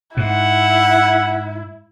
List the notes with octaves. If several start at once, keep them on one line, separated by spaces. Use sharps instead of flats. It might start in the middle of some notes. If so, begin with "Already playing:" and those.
G#2 E4 F#5